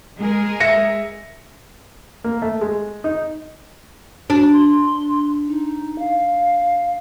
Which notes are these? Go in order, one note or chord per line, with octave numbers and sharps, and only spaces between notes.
G#3 G#4 A#4
E5 A#6 C#7
A#3
A3
G#3
D#4
D4 F#4
C6
D#4
F5